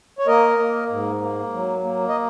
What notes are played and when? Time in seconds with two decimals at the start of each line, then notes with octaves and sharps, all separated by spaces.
0.19 C#5
0.27 A#3 A#4 D#5
0.59 A#3
0.90 G#2
1.22 A#3
1.53 F#3
1.84 A#3
2.09 D#5